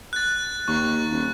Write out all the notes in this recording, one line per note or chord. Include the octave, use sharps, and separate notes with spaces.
F#6 A6
D#2 C#6
D#1